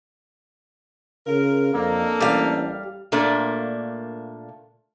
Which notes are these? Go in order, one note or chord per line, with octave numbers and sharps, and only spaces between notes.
C#3 F4 A#4
F2 A#3 D4 A4
A1 G3 F5
A#2 A3 A#3 D4